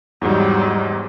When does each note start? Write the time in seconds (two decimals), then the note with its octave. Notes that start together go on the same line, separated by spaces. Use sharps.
0.21 E2 G#2 F#3 G3